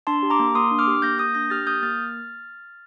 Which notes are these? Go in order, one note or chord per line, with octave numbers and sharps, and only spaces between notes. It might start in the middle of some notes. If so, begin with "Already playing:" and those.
D4 A5 C6
G4
A#5 D6
A#3
A#3 C6 D#6
D4
D6 F6
G4
A#3 G6 A#6
A#3 D#6 G6
D4 G6 A#6
G4 F6 A6
A#3 D#6 G6
A#3 F6 A6